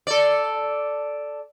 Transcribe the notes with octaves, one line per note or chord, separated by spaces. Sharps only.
A4 D5